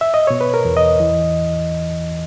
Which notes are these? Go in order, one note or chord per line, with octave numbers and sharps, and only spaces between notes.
E5
D#5
B2 C#5
B4
A#4
E2
D#5
E3